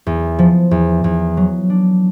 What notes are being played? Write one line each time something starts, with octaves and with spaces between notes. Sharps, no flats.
E2
F3
E2
E2
F#3
D4